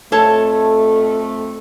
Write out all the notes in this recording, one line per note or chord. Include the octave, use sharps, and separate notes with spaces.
F2 A3 A4 C#5 A5